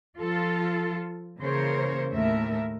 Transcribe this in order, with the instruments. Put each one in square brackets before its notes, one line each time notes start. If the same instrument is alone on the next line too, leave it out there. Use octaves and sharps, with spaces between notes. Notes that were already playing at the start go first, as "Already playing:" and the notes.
[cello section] F3 F4 A4
C#3 E3 A#3 A#4 C5 C#5
D#2 A2 A3 A#4 E5